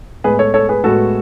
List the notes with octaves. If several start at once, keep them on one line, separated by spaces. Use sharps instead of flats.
A2 G#3 B3 G#4 B4
A4 C#5
A4 C#5
G#4 B4
A2 G#3 B3 F#4 A4